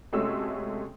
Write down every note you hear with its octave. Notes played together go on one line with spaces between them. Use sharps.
C3 G#3 A3 C#4 F#4 E6